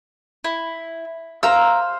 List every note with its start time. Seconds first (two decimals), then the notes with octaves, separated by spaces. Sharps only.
0.44 E4
1.43 C5 F5 A#5 E6